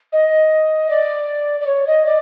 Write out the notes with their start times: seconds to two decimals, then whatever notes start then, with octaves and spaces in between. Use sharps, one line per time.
0.12 D#5
0.89 D5
1.60 D5
1.66 C#5
1.87 D#5
2.06 D5